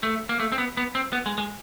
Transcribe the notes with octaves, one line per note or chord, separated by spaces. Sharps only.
A3
A#3
A3
C4
B3
B3
C4
B3
G#3
G#3